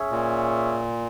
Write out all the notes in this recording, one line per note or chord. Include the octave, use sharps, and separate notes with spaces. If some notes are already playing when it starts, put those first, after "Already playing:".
Already playing: C#4 G#4 C#5 E5
A#2